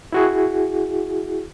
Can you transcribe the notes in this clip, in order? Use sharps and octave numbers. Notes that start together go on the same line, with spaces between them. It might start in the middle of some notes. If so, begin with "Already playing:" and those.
E4 F#4 G#4